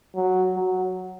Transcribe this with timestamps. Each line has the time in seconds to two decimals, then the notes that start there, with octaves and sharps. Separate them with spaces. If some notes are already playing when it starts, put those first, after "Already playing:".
0.15 F#3
0.55 F#3